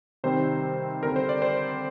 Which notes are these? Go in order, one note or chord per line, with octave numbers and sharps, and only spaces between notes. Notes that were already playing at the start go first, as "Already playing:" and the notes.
C3 D#3 G3 C4 C5
D3 G3 C4 A#4
C5
D5
C5